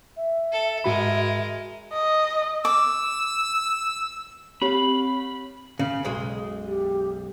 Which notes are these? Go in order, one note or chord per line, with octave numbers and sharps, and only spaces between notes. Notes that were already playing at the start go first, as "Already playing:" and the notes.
E5
A4
G#2 G#3 F#4 A#4 B5
D#5
D6 E6
C4 G4 C#5 B5
C#3
B1 F#2 G#3
G4